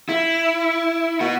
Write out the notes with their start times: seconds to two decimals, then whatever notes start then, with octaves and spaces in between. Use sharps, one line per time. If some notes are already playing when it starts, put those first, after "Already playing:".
0.09 E4
1.21 B3 F#4